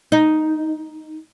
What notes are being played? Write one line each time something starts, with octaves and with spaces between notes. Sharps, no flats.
D#4